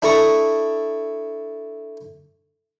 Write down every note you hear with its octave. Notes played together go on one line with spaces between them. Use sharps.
D4 E4 A4 A#5 C#6 D#6